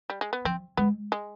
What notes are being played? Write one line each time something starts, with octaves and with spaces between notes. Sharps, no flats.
G3
G#3
B3
F3 C4
G#3 B3
G#3